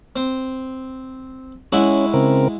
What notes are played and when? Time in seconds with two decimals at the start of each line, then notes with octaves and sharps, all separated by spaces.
0.16 C4
1.72 G#3 C#4 E4 F#4
2.14 C#3 C4 A#4